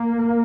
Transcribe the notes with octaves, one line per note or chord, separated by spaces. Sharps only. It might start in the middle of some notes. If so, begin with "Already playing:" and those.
Already playing: A#3